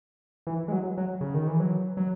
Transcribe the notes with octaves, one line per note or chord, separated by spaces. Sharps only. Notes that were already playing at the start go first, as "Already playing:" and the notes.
E3
G#3
F#3
F#3
C#3
D#3
E3
F#3
F#3